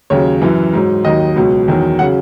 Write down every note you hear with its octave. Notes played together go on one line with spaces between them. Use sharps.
D#2 C#3 F#3 C#5
F#2 E3
G#2 F#3
D#2 D#3 F#3 D#5
C#2 B2 F#3
E2 D#3 F#3
C#3 F#3 F#5